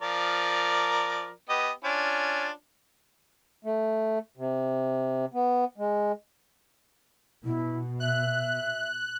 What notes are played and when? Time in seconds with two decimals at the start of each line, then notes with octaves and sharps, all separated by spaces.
0.02 F3 A#4 D5
1.49 B3 G4 D#5
1.84 C#4 D4 F4
3.64 A3
4.37 C3
5.34 B3
5.78 G#3
7.45 B2 E4
8.00 E5 F#6